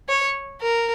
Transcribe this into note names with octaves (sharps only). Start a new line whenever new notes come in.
C#5
A#4